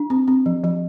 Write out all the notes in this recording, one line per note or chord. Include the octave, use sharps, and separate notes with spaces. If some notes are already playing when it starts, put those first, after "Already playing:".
Already playing: D4
C4
C4
F3
F3